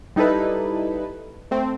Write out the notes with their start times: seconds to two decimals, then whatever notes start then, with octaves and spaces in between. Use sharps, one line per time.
0.16 G3 D#4 E4 A4 B4
1.51 A3 C4